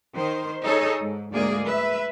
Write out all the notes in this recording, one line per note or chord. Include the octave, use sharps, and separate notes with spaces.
D#3 C5
D#4 G#4 A4 C#5 D#5
G#2
D2 G#2 G#3 A#3 G#4 D5
B4 E5